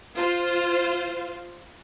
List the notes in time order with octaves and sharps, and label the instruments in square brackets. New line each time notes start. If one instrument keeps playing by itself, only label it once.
[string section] F4 C5 F5